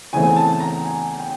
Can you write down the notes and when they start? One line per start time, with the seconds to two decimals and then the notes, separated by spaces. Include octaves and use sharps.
0.13 E2 C#3 E3 A3 C4 G#5
0.36 A5
0.60 A#5
0.84 G#5
1.19 G5